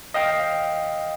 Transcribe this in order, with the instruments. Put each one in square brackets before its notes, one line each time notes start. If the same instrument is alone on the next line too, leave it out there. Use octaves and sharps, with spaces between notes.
[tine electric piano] D#5 F5 G5